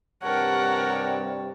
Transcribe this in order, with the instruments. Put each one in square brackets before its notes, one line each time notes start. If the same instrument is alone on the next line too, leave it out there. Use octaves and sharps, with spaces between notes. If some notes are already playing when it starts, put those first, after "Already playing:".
[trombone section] G2 C3 G3 [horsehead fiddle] A#4 F#5 [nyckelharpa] C#5 A5